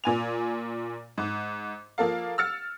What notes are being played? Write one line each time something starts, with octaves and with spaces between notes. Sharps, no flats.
A#2 G#5 F7
G#2
F3 A#3 A4 F5
E6 F6 A6 C#7